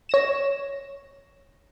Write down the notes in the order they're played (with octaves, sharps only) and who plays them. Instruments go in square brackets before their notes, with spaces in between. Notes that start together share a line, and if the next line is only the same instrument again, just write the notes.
[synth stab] C#5 A#6 E7